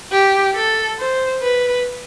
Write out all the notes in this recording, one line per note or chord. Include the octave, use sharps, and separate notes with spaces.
G4
A4
C5
B4